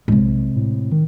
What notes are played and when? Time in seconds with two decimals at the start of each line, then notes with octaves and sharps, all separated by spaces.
0.08 A2 C3 G#3
0.19 B1
0.56 A2
0.91 D#3